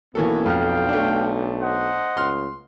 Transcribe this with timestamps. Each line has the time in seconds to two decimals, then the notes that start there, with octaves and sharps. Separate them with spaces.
0.15 B1 E3 A#3 B3 C#4 F#4 A4
0.46 F2 F5 G5 F6
0.89 A3 D4
1.62 C5 D#5 F#5
2.17 C#2 C6 F6